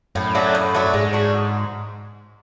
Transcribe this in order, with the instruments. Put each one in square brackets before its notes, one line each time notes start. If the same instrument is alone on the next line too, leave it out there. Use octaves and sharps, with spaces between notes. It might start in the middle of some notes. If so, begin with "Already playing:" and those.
[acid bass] F#2 [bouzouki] A2
[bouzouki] F#3 A3 D4
A2
F#3 A3 D4
[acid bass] G#2 [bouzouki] G#3
[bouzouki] D4 F#4